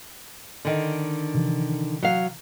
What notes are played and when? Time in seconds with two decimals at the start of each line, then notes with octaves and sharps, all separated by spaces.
0.65 D3 D#3
1.34 C3 E3 F3
2.02 F#3 F5